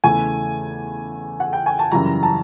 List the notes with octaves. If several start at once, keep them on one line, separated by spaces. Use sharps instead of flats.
E2 C#3 E3 A3 G#5
F#5
G5
G#5
A5
F#2 C#3 E3 G3 A#5
A5